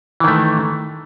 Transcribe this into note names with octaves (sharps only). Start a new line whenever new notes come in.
D#3 E3 A3